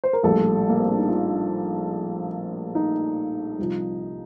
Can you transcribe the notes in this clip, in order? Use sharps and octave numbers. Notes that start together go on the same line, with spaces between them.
C5
A#4
A#1 A2 G3 A4
A#3
C4
D4
D#4
F4
D#4
C2 C3 F3